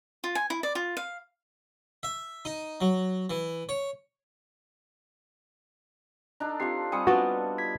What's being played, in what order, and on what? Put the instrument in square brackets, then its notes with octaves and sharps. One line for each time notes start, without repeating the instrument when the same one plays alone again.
[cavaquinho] F4
G#5
E4
D5
F4
F5
[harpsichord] E5
D#4
F#3
E3
C#5
[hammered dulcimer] D4 D#4 A4 [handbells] A#5
[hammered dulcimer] C4 F4 [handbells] G4 C7
[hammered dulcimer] G3 C4 A4 [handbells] G#5 D#6 C#7
[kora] B3 D4 D5 [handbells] F4 [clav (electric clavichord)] F#4
[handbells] G#6 B6